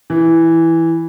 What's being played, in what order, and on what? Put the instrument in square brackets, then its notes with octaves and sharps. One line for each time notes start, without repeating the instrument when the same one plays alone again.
[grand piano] E3